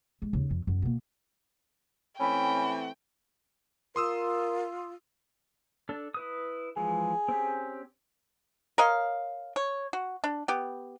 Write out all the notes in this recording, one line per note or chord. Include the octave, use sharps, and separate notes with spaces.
G#3
D#2 C#3
F2
F#2
B2 A#3
E3 A3 C4 C#4 G5 B5
F4 A#4 C6 D#6 E6
D4 A4
E4 B4 D#6
E3 F3 G#3 G#4
C4 C#4 G4
A#4 C#5 D#5 F5
C#5
F#4
D4
B3 G4